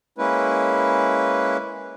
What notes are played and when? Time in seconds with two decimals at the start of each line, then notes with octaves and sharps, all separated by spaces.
0.18 G#3 A#3 C#4 E4 B4